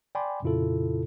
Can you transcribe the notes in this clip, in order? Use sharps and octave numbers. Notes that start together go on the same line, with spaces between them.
D5 G5 G#5 B5 C6 D6
F2 A#2 C#3 E4 F4 A4